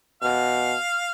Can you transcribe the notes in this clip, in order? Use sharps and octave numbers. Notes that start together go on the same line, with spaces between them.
B2 F5